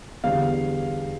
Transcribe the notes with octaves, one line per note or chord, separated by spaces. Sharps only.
E2 D3 G3 F5